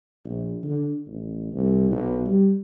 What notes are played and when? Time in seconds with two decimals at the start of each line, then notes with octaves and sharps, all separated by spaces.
0.25 A#1
0.63 D3
1.07 A1
1.52 C2
1.91 B1
2.26 G3